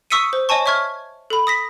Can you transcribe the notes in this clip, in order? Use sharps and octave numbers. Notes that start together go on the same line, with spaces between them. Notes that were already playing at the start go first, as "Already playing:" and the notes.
C#6 D#6 E6 B6 C#7 D#7
C5
C#5 D#5 G#5 A5 C#6
C#5 E5 C#6 F6 G#6
A4 B5
D#6 A#6 B6